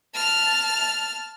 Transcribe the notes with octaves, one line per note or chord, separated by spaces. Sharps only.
A5 F6